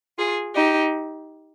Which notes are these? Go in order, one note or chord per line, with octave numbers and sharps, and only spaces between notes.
F4 G#4
D#4 G4